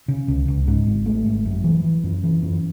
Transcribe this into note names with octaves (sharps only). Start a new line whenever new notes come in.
C#3
C#2
C#2
G#2
G#1
A3
G#1
F#2
E3
E3
F#2
E3
F#2